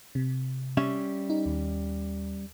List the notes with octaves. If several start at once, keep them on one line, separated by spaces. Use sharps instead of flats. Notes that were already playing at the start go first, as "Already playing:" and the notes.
C3
G3 C#4 E5
D#4
D#2